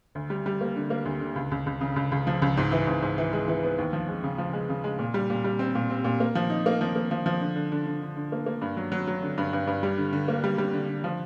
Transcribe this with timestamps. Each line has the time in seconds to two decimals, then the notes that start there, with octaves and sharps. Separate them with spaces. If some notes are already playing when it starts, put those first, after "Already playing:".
0.15 D2
0.30 G3
0.46 G3
0.61 A#3
0.76 D3
0.90 A#3
1.05 D2
1.20 D3
1.36 C#2
1.51 C#2
1.66 C#2
1.81 C#3
1.96 C#2
2.12 C#2
2.27 F3
2.42 C#2
2.57 G#2
2.72 E3
2.87 G#2
3.02 G#2
3.18 E3
3.33 G#3
3.48 E3
3.63 B3
3.78 D#2
3.93 F3
4.08 G#3
4.24 C#3
4.38 F3
4.53 G#3
4.69 C#3
4.84 G#3
4.99 A#2
5.14 G3
5.30 A#2
5.44 G3
5.59 C4
5.75 A#2
5.90 C4
6.04 A#2
6.20 A#3
6.35 F3
6.50 D#4
6.66 A#3
6.81 F3
6.96 A#3
7.11 F3
7.26 F3
7.41 D3
7.56 D3
7.72 D3
7.86 D3
8.02 D3
8.17 D3
8.32 A#3
8.46 A#3
8.61 G2
8.77 F#3
8.92 F#3
9.07 F#3
9.23 D3
9.38 G2
9.53 G2
9.67 G2
9.83 G3
9.98 D3
10.13 D3
10.28 A#3
10.44 G3
10.58 G3
10.73 D3
10.88 D3
11.04 F3